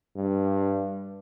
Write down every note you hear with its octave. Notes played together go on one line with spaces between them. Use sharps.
G2